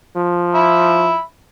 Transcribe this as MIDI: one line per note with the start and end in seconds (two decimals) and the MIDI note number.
0.16 1.17 53
0.55 1.21 76
0.55 1.21 83